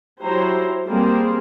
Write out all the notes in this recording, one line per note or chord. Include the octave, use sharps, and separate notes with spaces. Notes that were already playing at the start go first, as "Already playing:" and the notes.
F#3 E4 G4 C5 A#5
G3 A#3 C4 G#4 A#4 C5